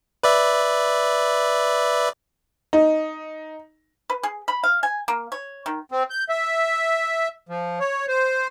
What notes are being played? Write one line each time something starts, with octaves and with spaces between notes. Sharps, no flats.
B4 D5 E5
D#4
B4
G#4
B5
F5
G#5
A#3
C#5
D#3
C4
G6
E5
F3
C#5
C5